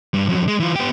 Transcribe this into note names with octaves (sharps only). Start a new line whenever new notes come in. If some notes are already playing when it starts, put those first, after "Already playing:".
G2
F2 F#3
G#3
E3 F4
B3 G4